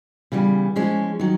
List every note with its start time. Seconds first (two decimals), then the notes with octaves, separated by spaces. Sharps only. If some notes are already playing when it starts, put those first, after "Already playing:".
0.32 C#3 E3 G3 B3
0.76 F3 G#3 C#4
1.19 D#3 F#3